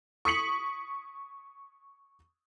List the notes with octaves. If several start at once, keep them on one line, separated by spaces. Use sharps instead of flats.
C#6 D#6 B6 C#7 F#7